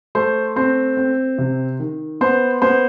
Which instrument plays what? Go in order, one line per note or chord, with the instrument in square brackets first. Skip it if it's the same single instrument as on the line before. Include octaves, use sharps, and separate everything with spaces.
[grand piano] A3 C5
C4 C5
C4
C3
D#3
B3 C5
B3 C5